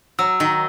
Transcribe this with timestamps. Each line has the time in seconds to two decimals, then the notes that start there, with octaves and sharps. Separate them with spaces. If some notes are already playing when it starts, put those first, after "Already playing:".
0.19 F#3 E6
0.40 D#3